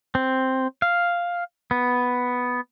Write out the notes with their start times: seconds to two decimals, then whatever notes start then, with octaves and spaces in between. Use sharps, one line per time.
0.15 C4
0.82 F5
1.71 B3